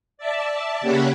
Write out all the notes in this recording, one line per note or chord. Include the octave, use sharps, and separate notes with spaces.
D5 E5 A5
C#3 A#3 G4 C#5 F#5 B5